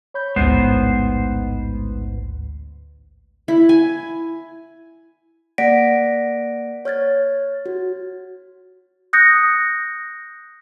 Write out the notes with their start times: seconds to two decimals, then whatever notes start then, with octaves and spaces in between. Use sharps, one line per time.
0.14 C#5 B5 G6
0.36 A1 D2 G#2 B3 C5
3.48 E4
3.69 G#5
5.58 A#3 D5 F#5 A#6 B6 D7
6.85 C#5 F6 G#6 A6
7.66 F#4
9.13 D#6 F#6 G6 A#6 C#7